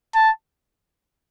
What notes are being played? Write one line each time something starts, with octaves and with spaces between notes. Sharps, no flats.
A5